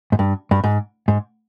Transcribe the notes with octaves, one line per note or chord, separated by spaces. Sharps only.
G#2
G2
G2
G#2
G#2